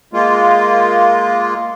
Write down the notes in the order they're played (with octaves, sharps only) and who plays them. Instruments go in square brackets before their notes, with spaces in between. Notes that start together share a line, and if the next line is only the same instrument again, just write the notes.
[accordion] G#3 A#3 F4